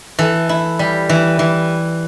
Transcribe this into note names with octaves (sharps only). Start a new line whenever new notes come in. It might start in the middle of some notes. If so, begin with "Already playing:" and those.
E3 A4
E4
G3
E3
E3